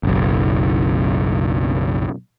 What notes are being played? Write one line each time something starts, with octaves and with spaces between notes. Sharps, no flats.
F#1 B1